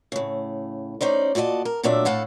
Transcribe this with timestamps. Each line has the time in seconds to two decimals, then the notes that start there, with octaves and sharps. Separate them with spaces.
0.12 A2 C#3
1.01 C#4 D#4 C5 D5
1.35 A#2 F#4 D5 D#5 A5
1.65 A#4
1.83 A#2 F#3 A3 D4 D5 E5
2.05 A2 A4 F5 F#5